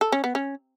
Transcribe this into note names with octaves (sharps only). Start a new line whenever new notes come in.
A4
C#4
B3
C#4